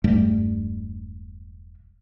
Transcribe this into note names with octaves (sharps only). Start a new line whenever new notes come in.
E1 G2 G3 A3